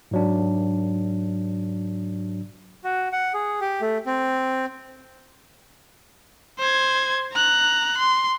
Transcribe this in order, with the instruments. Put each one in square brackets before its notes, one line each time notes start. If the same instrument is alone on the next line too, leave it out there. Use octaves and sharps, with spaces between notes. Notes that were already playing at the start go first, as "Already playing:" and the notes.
[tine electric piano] G#2 F#3 D4
[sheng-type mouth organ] F#4
F#5
G#4
G4
A3
C4
[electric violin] C5 G#6
A#5 F#6
C6